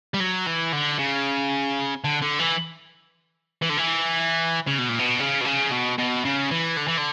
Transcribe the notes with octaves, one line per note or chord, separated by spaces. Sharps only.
G3
F#3
E3
D3
C#3
D3
D3
E3
E3
D3
E3
C#3
B2
A#2
B2
C#3
B2
C#3
B2
B2
C#3
E3
D3
E3
D3